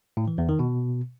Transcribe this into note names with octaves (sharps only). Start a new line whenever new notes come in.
A2
E3
E2
D#3
B2